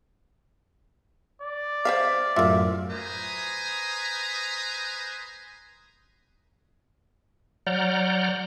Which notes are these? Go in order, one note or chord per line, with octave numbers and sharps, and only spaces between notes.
D5
C5 E5 F5
F#2 A2 F4 A#4 E5
B4 C5 G#5 A#5 D#6
F#3 D5 F#5 A#5 F6 G6